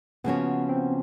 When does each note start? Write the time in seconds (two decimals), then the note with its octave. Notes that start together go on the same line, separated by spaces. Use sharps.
0.24 C#3 F3 A#3 B3 C#4 F#4
0.69 C4